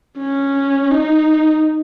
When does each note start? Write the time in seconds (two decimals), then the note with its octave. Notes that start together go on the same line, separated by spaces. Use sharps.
0.18 C#4
0.91 D#4